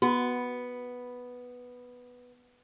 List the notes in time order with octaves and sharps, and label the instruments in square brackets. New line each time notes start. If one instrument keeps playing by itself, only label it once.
[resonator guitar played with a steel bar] B3 [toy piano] F#4